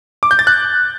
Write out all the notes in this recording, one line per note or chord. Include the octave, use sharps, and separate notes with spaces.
D6
G6
A6
F#6